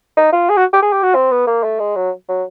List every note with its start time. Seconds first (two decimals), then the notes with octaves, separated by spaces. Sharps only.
0.17 D#4
0.32 F4
0.49 G#4
0.57 F#4
0.73 G4
0.82 G#4
0.92 G4
1.03 F#4
1.15 C4
1.31 B3
1.47 A#3
1.63 A3
1.79 G#3
1.96 F#3
2.29 F#3